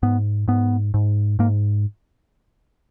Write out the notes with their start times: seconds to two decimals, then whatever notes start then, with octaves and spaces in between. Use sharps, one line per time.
0.03 G#2 B3
0.48 G#2 B3
0.94 G#2
1.39 G#2 A#3